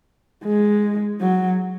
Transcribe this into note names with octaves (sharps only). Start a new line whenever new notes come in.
G#3
F#3